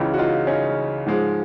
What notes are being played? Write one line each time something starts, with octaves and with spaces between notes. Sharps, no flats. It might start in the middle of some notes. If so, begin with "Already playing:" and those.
Already playing: C#2 C#3 E3 D#4 F4
F#4
D#4 F4
C#4 D#4
G#2 F3 G#3